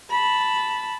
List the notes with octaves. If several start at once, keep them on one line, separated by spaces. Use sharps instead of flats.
A5 B5